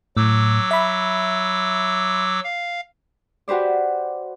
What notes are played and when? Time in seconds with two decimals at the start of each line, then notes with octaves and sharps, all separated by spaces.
0.17 A2 F#3 D6 E6
0.71 E5 B5
2.44 F5
3.48 F#4 G4 B4 C5 D5